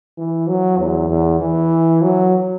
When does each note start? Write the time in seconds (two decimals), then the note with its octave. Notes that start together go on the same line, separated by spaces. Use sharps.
0.18 E3
0.48 F#3
0.79 E2
1.10 E2
1.41 E3
2.02 F#3